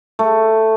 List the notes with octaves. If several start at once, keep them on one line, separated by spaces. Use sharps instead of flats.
A3